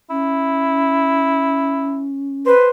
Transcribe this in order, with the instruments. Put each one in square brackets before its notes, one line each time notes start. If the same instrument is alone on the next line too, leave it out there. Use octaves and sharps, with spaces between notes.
[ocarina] C#4 [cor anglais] E4
[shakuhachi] B4 [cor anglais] C5